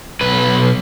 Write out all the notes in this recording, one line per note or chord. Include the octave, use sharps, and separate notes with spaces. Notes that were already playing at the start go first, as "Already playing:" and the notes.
B1 B4